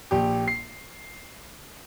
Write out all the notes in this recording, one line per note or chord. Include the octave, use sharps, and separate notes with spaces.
A#1 G4
C7